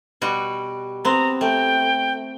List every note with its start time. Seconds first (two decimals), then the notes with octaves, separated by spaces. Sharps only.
0.21 B2 G3 F#4
1.05 B3 C4 A#5
1.41 A3 G5